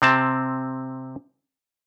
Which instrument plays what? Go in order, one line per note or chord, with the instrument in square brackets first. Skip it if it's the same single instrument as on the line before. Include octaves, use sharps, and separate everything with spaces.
[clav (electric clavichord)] C3 C4 A5